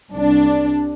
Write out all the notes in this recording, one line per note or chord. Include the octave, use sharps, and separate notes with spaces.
C2 D4